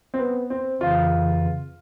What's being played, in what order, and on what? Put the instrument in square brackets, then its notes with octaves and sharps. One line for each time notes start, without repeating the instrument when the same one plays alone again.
[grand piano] C4
B3
C4
[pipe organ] F2 C#3 E3 [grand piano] F4